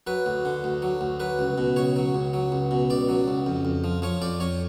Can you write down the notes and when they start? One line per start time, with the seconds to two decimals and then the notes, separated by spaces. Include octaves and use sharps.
0.07 F#3 B4
0.26 D2
0.45 D3
0.64 D2
0.82 F#3
1.01 D2
1.20 F#3 B4
1.39 C#2
1.58 B2
1.76 C#2 C#5
1.96 F#3
2.15 C#2
2.33 F#3
2.52 C#2
2.71 B2
2.90 C#2 D5
3.09 F#3
3.28 C#2
3.46 F2
3.65 F2
3.84 F3
4.02 F3 C#5
4.22 F2 D5
4.40 F2 C#5